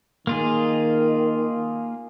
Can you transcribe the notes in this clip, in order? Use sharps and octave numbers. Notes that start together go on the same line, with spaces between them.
D#3 A#3 F4 G#4